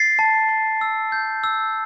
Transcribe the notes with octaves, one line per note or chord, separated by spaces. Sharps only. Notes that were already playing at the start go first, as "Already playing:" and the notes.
Already playing: A6 C7
A5
A5
E6
G6
E6